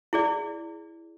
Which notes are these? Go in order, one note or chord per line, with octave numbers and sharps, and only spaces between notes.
E4 G#4 D5